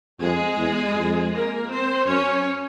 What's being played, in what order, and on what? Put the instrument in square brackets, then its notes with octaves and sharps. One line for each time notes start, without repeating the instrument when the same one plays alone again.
[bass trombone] F2 [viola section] G#3 G#4
[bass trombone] E2
F2
[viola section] A#3 A#4
C4 C5
[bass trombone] F#2 [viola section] C#4 C#5